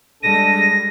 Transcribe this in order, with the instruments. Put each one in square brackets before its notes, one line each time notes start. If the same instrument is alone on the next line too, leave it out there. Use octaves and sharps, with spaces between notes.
[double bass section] G3 G#3 [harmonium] D4 A4 [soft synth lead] A#6 [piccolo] D#7